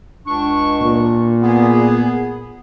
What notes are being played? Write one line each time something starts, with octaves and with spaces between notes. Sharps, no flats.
C#2 D4 C#6
A#2
B3 G#4